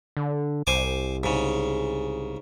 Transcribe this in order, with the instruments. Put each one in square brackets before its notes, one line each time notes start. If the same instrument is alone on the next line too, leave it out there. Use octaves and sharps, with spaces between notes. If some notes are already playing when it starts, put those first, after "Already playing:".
[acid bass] D3
[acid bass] C2 [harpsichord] C5 G#5 D6
[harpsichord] G#2 C#3